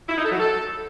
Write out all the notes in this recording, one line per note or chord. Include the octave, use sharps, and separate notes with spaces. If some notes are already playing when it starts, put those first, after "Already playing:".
E4
D#4
A4
F#3
A4